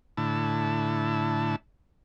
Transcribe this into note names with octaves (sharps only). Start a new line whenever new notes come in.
A2 D3 E4 A5